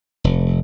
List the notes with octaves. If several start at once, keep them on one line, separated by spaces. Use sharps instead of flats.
F1